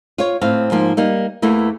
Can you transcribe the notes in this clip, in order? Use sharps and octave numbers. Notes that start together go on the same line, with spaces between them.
F4 C#5
A2 C4 F5
G#2 F3 A#3
G3 A#3 D#4
E2 E3 A3 A#3